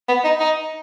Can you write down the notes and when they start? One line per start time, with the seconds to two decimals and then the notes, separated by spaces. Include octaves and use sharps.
0.08 B3
0.24 D#4
0.40 D#4